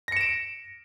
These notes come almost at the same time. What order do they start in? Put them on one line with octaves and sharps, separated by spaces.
A#6 C#7 E7 D7